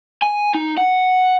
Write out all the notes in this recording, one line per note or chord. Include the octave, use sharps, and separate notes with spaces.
G#5
D#4
F#5